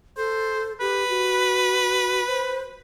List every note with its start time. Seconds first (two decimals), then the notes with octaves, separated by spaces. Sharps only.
0.17 A4 C5
0.80 G4 B4
1.09 F#4
2.27 C5